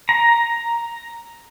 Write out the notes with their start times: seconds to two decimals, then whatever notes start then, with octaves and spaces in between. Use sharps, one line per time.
0.09 A#5